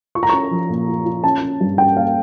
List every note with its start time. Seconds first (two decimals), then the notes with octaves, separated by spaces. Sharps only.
0.15 F4 C#6
0.23 A#5
0.29 C#4 C#6
0.51 F3
0.69 A#2
0.88 F4
1.05 F4
1.24 C#4 A5
1.41 C#4
1.61 G2
1.78 C#4 G5
1.97 A#3 F5